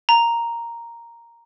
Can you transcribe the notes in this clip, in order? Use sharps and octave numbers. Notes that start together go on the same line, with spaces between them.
A#5